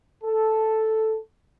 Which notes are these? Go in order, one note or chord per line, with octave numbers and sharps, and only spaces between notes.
A4